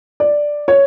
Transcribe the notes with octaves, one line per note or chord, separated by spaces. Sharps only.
D5
C#5